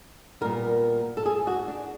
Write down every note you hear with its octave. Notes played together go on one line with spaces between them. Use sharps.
A#2 G3 B3 A#4
A4
G#4
F#4
D4